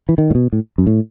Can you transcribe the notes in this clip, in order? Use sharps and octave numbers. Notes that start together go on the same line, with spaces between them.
E3
D#3
A2
B2
A2
F#2
A2